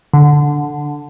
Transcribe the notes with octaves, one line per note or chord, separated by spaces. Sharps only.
D3